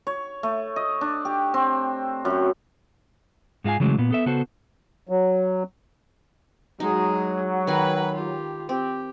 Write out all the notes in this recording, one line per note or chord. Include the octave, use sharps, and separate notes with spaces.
C#5
A3
D#5
D4
G4
C4
F#2
G#2 G#3 F4 F5 G#5
C#3 E3 F#3 G#3 A3
A#2 B3
B3 A4 E5
C#3 B3 F#4 A4 C5
F#3
F#3 G#3 D#4 G#4
D#3 B4 G#5 A#5 B5
F4 G4
C4 G4